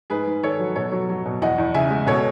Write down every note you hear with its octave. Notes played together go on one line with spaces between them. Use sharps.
G#2 G#4 B4
G#2
D#3 A4 C#5
F#3
B2 A4 C#5
F#3
F#3
B2
E2 D#5 F#5
E2
C#3 E5 G#5
G#3
B2 A4 C#5